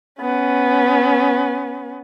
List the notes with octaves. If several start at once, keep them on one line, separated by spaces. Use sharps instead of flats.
B3 C#4